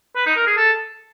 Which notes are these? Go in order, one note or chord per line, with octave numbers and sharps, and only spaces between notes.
B4
D#4
A#4
G#4
A4